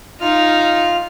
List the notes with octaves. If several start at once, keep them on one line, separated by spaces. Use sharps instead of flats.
D#4 F4 F6